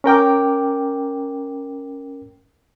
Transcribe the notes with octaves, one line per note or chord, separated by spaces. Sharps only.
C#4 A#4 G5 D6